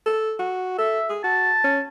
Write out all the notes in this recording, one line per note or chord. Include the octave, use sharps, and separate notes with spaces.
A4
F#4
A4 E5
G#4
F#4 A5
C#4